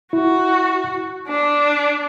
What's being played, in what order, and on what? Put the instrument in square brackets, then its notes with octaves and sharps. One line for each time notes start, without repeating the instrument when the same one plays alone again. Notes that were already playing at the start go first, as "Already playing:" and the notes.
[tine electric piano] E4 [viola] F#4
[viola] D4